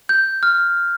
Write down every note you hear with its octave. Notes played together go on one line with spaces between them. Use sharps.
G6
F6